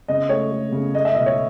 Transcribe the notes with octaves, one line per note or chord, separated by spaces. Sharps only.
C#3 D#5
A3 C#5
A3
C#3
A3 D#5
E5
B2 D#5
C#5